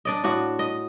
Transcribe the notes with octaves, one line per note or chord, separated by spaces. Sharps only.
D4 D5 D#5
A2 D4 F#4
D#5